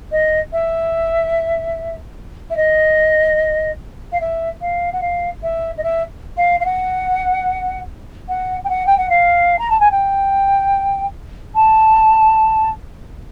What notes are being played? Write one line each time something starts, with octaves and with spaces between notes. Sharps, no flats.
D#5
E5
E5
D#5
F5
E5
F5
F#5
F5
E5
D#5
E5
F5
F5
F#5
F#5
G5
F#5
G5
F#5
F5
A#5
A5
G#5
G5
A5